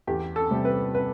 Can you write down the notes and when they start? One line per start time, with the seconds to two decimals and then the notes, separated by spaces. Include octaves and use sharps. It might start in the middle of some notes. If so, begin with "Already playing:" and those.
0.07 E2 G4
0.36 A4
0.51 C3 G3
0.65 B4
0.95 B4